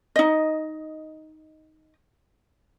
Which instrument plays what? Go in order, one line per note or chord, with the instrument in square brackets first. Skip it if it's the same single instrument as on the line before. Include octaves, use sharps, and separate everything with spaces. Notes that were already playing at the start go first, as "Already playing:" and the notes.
[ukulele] D#4 D#5